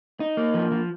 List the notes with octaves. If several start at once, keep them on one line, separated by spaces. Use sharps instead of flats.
D#4
A#3
F3
F3